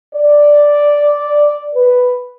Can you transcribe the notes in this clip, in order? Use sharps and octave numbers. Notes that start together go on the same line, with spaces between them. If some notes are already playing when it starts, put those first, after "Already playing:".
D5
B4